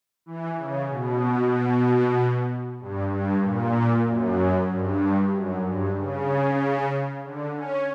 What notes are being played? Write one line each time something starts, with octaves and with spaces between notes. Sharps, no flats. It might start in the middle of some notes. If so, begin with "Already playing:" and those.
E3
C#3
B2
G2
G2
A#2
F#2
G2
F#2
G2
C#3
D3
C#4